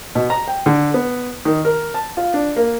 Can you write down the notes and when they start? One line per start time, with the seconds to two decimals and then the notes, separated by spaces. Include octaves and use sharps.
0.15 B2
0.30 A#5
0.48 G5
0.66 D3
0.94 B3
1.45 D#3
1.65 A#4
1.94 A5
2.17 F4
2.34 D4
2.56 A#3